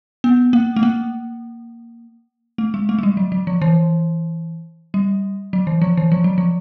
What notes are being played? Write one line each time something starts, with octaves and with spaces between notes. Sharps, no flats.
B3
A#3
A3
A#3
A3
G#3
A3
G#3
G3
F#3
F#3
F3
E3
G3
F#3
E3
F3
E3
F3
F#3
F3